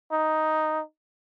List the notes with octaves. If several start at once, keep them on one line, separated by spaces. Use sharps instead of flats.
D#4